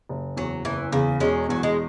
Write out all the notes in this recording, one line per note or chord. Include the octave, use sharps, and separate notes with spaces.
F#1
E2 F#3
F#1 E3
E2 C#3
E1 G#3 C#4
E2 F#3
G#3